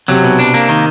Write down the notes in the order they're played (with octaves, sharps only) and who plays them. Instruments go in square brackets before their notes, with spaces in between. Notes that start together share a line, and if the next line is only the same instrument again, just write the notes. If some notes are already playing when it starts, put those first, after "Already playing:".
[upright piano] C3 [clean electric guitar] F#3
[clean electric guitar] B2
D4
A#3
D#3